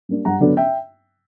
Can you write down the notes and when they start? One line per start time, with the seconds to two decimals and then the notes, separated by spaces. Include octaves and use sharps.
0.09 G3 A#3 D4
0.25 G2 F#5 A#5
0.40 D3 F#3 B3 D4
0.57 E5 G5